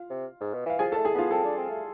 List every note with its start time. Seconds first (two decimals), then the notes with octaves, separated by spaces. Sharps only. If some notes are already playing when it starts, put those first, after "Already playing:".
Already playing: F4 F5
0.10 C3
0.41 G#2
0.54 B2
0.66 E3 F5
0.79 F3 G#4 G#5
0.92 A4 A5
0.97 A3
1.05 G#4 G#5
1.14 B3 F4 F5
1.31 C4 A4 A5
1.44 D4
1.57 C4
1.70 A3